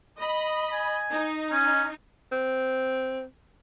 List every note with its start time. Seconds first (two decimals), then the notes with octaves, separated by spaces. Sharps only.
0.18 D#5 B5
0.73 G#5
1.10 D#4
1.52 C#4
2.32 C4